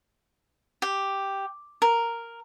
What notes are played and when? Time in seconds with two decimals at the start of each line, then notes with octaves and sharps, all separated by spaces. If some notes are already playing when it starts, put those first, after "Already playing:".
0.82 G4
1.82 A#4